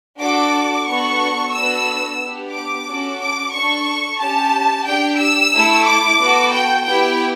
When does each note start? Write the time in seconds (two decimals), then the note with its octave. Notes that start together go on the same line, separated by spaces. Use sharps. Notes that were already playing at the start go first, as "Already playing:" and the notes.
0.19 D4 F#4 A4 D6
0.86 B3 D4 F#4 A4 C#6
1.53 B3 D4 F#4 A4 E6
2.19 B3 D4 G4
2.53 D6
2.86 C#4 F#4 A4
3.19 D6
3.52 D4 A4 C#6
4.20 C#4 G4 A5
4.86 D4 G4 G5
5.19 E6
5.52 A3 E4 A4
5.86 D6
6.19 B3 F#4 A4
6.52 G5
6.86 B3 E4 G4 G5